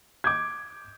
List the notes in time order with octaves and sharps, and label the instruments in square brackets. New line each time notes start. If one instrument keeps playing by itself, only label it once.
[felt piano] D6 G6 G#6